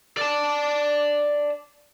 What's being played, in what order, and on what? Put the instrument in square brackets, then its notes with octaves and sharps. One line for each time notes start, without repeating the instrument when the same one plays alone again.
[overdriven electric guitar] D5 A5